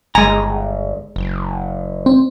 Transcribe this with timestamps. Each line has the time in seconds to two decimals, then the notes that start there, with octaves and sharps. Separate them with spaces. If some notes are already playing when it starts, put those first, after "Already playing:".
0.15 G1 G#3 G#5 A#5
1.16 F#1
2.06 C4